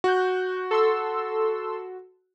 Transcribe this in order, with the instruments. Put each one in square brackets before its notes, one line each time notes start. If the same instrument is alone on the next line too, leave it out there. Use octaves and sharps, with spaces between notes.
[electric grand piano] F#4 [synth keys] F#6 G6
[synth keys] A4 C6 E6